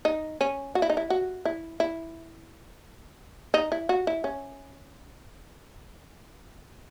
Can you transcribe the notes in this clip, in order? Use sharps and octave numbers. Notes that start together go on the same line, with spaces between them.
D#4
C#4
F#4
E4
D#4
E4
F#4
E4
E4
D#4
E4
F#4
E4
C#4